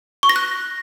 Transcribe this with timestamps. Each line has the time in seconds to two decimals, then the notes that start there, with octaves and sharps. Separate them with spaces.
0.23 C#6
0.29 A#6
0.36 F#6